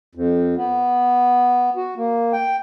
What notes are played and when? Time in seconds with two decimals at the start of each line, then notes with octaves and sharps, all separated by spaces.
0.15 F2
0.57 B3
1.76 F#4
1.97 A#3
2.33 G5